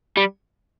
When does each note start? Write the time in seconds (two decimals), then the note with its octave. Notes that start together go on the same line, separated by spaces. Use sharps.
0.17 G3